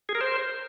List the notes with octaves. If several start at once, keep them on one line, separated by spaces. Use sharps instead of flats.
G#4
A#4
C5